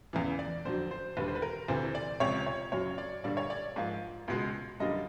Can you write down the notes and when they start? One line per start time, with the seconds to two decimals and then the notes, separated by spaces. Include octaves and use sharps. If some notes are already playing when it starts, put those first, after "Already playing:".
0.13 E2 C#3 E3
0.39 D5
0.65 F2 D3 F#3 C5
0.91 C5
1.17 D#2 D3 G3 B4
1.28 C5
1.35 B4
1.42 A#4
1.68 D2 C3 E3 C5
1.95 D5
2.20 C#2 C3 F3 C#5
2.46 C#5
2.72 F#2 C#3 F#3 C#5
2.98 D5
3.24 G2 D3 G3 A#3 D5
3.37 C#5
3.50 D5
3.76 G#2 F3 A#3
4.28 C#2 B2 G#3
4.80 F#2 D3 G3 A#3 D#5